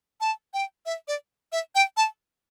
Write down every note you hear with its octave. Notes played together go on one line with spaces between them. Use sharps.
A5
G5
E5
D5
E5
G5
A5